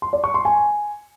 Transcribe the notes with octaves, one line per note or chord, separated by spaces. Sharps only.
C6
D5
C#6
C6
G#5